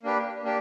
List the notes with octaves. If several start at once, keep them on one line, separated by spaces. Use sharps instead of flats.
A#3 D4 G4 B4
A#3 D4 G4